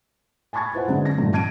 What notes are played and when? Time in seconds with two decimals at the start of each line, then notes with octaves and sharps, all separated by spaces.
0.53 G#5 A5 B5 C#6 G#6 A6
0.73 E4 F4 B4 C5 E5 F#5
0.88 D3 F#3 G#3
1.05 A#6
1.17 G2 A#2 D#3 F3 F#3 A3
1.33 A5 G#6 D7 D#7